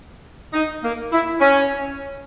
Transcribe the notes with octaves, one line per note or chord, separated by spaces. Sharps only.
D#4
A#3
E4
C#4